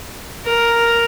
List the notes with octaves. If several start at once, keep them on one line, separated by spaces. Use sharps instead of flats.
A#4